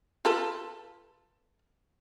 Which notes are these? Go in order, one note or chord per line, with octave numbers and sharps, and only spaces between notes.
F4 A4 B4